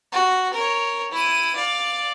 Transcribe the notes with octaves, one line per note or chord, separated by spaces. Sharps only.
F#4
A#4 C#5
E4 D#7
D5 F5